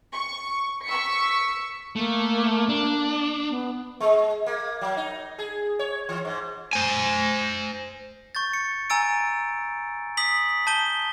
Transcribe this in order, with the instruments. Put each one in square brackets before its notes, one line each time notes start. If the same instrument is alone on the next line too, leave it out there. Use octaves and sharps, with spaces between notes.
[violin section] C#6
C#6 E6 B6 C#7
[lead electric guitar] A3 [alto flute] A#3
[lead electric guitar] D4
[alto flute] B3
[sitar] G#3
A#3
F#3
D#4
G#4
C#5
E3
G#2
[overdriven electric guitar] C5 G#5
[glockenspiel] C#6 G6 A6
C#7
G#5 A#5 E6 A6 D7
D#6 B6 F#7
A5 G6 D#7 G7